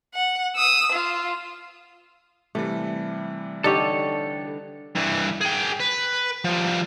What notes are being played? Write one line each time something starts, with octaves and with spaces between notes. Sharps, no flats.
F#5
D#6 E6
F4
C3 E3 G3 A3
D3 D#4 G4 A4 C#5
G2 E3
G#4 G5
B4
F3 G3